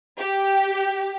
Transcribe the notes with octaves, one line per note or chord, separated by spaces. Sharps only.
G4